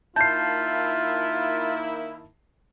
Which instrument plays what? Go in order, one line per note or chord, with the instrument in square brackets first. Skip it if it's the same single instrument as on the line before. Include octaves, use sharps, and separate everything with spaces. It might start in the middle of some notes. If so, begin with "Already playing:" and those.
[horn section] D#3 A#3 E4 [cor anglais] F4 [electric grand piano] A5 C7 [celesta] G6